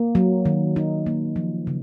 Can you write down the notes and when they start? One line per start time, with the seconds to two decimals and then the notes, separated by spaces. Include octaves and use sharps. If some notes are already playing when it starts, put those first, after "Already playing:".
Already playing: A#3
0.15 F#3
0.45 D#3
0.76 D#4
1.06 A#3
1.36 F3
1.67 C#3